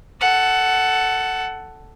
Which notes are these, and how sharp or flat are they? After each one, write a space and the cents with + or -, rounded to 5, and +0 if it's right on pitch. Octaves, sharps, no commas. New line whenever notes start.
A4 +0 F#5 +15